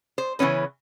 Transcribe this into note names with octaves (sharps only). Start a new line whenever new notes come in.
C5
C#3 E3 B3 C#4 B4